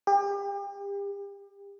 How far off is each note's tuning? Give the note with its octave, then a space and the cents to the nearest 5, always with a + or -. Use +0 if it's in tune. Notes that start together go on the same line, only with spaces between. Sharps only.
G4 +35